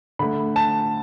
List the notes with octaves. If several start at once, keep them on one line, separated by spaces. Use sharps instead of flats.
D3 A3 B5
A5